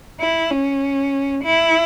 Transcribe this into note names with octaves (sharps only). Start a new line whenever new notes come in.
E4
C#4
E4